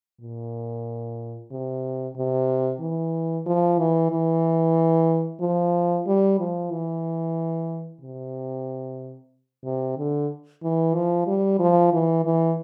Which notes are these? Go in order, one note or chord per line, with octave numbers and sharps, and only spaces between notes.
A#2
C3
C3
E3
F3
E3
E3
F3
G3
F3
E3
C3
C3
D3
E3
F3
G3
F3
E3
E3